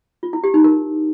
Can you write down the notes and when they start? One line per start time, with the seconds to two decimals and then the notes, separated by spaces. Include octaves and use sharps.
0.23 F4
0.33 E4
0.44 G4
0.54 D#4
0.64 A#4